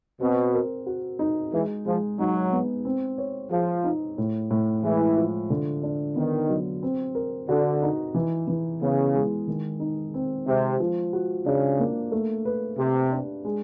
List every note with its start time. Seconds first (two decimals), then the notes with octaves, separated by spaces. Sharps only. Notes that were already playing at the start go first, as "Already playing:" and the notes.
0.20 B2 C4
0.54 A#4
0.86 F#4
1.19 D#4
1.53 E3 G#3
1.86 F3 G#3
2.19 F#3 D#4
2.52 B3
2.85 C4
3.18 C#5
3.51 F3 G#4
3.84 D#4
4.18 A2
4.51 A2
4.83 E3 G#3
5.17 F3
5.50 D3
5.83 D4
6.16 D#3 B3
6.49 F#3
6.83 C4
7.15 A#4
7.49 D3 F#4
7.82 D#4
8.14 E3
8.47 E3
8.82 C#3 B3
9.14 G#3
9.48 D#3
9.80 D#4
10.14 C4
10.46 C3 G#3
10.80 F3
11.13 F#4
11.46 C#3 D4
11.80 A#3
12.12 A3
12.45 B4
12.78 C3 G4
13.12 D4
13.45 G#3